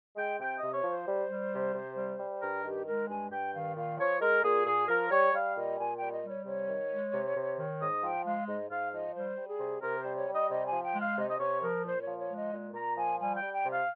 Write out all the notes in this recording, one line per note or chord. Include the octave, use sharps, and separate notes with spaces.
G#3 G5
C3 G5
D#5
C3
C#5
F3
C5
G3
G3
C3
C3
G3
G3
G2 A#4
D#3 G4
G#3 A#4
G2 G#5
G2 G5
D#3 F5
A#2 F5
F3 C#5
G#3 A#4
A#2 G#4
A#2 G#4
F3 A#4
G3 C#5
G3 F5
A#2 D#5
A#2 G#5
G5
G3
D#5
G3
C#5
C3 C#5
D#3
G#3
C3
C3
D#3
G#2 D#5
F3 G5
G#3 F5
G#2 D#5
G#2 F5
F3 D#5
G3 C5
G3
G#4
C3
C3 A#4
C5
G3
C#5
G3
D#5
C3 D#5
G#5
F3
G5
G#3
F5
C3 D#5
D#5
C3 C#5
F3 A#4
A#2 C5
C#5
F3
C#5
G#3
D#5
A#2
A#2 A#5
F3 G#5
G3 G#5
G5
G3
G5
C3
F5